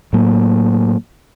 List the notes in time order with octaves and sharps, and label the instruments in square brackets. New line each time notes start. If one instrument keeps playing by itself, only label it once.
[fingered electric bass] A2 F#3 A#3